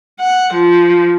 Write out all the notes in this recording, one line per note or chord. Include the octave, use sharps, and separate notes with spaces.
F#5
F3